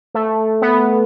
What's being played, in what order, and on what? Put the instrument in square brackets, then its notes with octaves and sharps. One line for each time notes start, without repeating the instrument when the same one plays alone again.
[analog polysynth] A3
B3